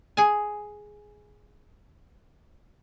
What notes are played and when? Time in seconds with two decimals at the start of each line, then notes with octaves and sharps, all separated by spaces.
0.17 G#4 G#5